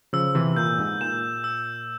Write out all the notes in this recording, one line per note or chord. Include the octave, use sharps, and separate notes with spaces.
C#3 F3 E6
C3 E3
A#2 G6
G#2
A#2 E7
E6